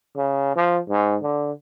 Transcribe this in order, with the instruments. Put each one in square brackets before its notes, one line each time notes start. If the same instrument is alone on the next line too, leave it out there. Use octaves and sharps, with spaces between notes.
[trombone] C#3
F3
G#2
D3